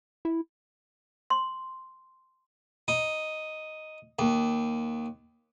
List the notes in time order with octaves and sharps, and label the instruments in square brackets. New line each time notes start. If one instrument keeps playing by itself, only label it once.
[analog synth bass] E4
[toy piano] C6
[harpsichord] D#4
D#2